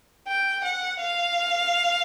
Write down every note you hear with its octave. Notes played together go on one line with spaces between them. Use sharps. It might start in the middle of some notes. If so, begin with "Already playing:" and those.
G5
F#5
F5